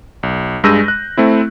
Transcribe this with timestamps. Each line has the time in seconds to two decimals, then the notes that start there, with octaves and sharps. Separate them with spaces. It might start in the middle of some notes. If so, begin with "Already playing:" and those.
0.23 B1
0.64 G2 G#3 E6 G6 A#6 D#7
0.88 F#6
1.17 A3 C4 E4